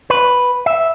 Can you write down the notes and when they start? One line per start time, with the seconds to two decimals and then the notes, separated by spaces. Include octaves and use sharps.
0.10 B4
0.66 E5